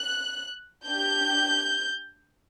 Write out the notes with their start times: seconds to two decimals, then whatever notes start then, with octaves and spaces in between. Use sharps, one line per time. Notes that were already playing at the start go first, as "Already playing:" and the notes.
Already playing: F#6
0.86 D4 G4 G6